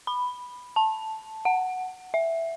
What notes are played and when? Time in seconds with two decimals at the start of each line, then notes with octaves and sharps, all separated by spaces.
0.07 B5
0.76 A5
1.45 F#5
2.14 E5